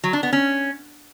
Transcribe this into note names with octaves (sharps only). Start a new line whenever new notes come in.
F#3
D4
B3
C#4